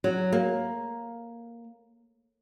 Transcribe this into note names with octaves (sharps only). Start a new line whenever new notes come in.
F#3
A#3